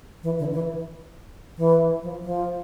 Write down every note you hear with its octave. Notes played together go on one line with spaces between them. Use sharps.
E3
D3
E3
E3
F3
F3